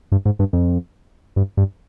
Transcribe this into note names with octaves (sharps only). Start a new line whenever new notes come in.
G2
G#2
G2
F2
G2
G2